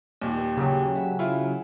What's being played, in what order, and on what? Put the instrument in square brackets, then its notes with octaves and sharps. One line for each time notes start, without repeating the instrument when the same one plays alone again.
[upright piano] D#2 A#2 [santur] G3
[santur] B4
[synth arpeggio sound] C#3 F#3 [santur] G4 G#4
[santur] E5 F#5 E6
[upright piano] E4 F4 [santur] F#5 C#6